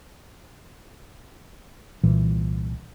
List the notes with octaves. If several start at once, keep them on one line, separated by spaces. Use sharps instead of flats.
C2 A#2 E3